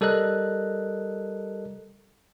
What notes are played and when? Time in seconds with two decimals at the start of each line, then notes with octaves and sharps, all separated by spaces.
0.01 G3 A4 A#4 D#5 F#6